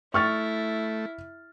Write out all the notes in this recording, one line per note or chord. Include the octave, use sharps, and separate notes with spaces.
A3 E4 C#6 F6 A6